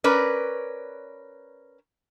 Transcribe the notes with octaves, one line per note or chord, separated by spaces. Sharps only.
C#4 A#4 B4 D5